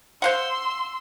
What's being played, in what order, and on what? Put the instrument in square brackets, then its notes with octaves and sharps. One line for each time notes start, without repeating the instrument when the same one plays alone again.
[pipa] C5 F5 F#5 [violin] C6 E6